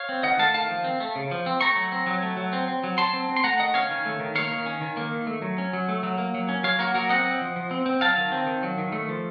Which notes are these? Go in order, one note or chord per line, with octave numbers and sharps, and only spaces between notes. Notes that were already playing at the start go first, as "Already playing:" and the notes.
Already playing: C#5 F5
C4
D#3 D#5 F#5
A3 F5 A5
D#3 F5 A5
F3
C4
A3
C#3
F3
C4
A3 A#5 C#6
F#3
C4
F#3
A3
F#3
C4
C4
F#3
F#3 A5 C6
C4
C4
C6
A3 F#5 A#5
D#3 D#5 F#5
C#4 C#5 F5
D#3
A3
D#3
A#3 C#5 F5
D#3
C#4
D#3
A#3
D#3
A3
F#3
C#4
F#3
A3
F#3
A#3
F#3
C#4
F#3 C#5 F5
A#3 F#4 A#4
F#3 F#4 A#4
C4 D#5 F#5
C4
F3
F3
C4
C4
F#3 F5 A5
D#3
C4
D#3
F#3
D#3
A3
F3